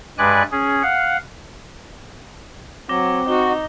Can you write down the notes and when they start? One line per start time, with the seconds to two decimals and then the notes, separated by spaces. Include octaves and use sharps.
0.18 G2 G#3 B4 D5 G#5 F#6
0.51 C#4 G#4
0.83 F5 F#5
2.89 F#3 C4 D6 A#6 G7
3.28 D#4 F#4 G7